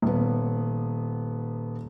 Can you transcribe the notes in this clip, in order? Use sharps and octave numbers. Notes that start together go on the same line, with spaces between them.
D#1 B3